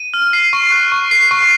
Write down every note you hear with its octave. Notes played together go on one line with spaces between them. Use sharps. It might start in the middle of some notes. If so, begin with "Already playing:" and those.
Already playing: D#7
F6
C7
C#6
F#6
C#6
C7
C#6